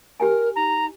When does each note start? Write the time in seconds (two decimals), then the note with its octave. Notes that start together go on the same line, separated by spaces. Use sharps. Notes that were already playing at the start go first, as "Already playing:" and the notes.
0.20 G4 A#4 G5 G#5
0.56 D#4 A#5